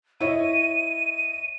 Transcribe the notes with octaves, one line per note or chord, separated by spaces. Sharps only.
E4 C#5 D#5 D#7